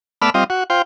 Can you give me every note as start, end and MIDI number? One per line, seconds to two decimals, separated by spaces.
0.22 0.30 57
0.22 0.30 59
0.22 0.30 74
0.22 0.30 83
0.22 0.30 88
0.22 0.30 89
0.34 0.44 55
0.34 0.44 60
0.34 0.44 65
0.34 0.44 75
0.50 0.64 66
0.70 0.82 65
0.70 0.82 72
0.70 0.82 79